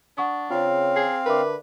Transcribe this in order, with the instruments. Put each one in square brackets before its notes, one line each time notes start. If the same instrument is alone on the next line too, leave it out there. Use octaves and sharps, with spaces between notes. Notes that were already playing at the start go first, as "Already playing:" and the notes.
[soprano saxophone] D4 [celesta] F#5 C#6 D#6
[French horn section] C#3 C#5 [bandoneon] C4 F5 [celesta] F4
[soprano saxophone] G#4 [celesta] C7
[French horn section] D3 D4 [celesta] A#4 E5 D6 [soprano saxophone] B4